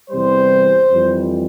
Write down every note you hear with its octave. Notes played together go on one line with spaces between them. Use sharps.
E2 C3 E3 G3 C5
F2 E3 G3